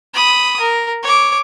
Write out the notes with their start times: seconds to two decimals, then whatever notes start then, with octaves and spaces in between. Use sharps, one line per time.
0.14 B5 D#6
0.60 A#4
1.03 C#5 D6